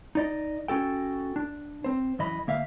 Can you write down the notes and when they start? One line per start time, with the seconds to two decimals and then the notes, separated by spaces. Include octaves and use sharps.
0.15 D#4 D5 D#5
0.68 C#4 F#4 A4 G5
1.36 D4
1.84 C4 C5
2.19 F#2 E3 D#5 B5
2.47 D2 A#3 E5 F5